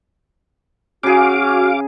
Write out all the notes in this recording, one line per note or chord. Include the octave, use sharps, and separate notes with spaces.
C#3 F#4 G#4 F5 D6